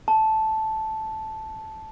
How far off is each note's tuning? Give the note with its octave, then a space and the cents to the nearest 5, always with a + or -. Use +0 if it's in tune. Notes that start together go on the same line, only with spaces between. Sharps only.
A5 -5